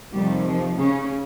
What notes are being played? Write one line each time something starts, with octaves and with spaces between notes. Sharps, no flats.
F2 C3 D#3 G3
F3
C#3 C#4